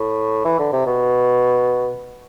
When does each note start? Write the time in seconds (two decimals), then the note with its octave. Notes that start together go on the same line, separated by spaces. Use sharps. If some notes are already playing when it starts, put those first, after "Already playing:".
Already playing: A2
0.45 E3
0.59 D3
0.73 C3
0.86 B2